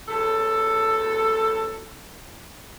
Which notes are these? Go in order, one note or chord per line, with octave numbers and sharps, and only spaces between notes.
E2 F#3 A4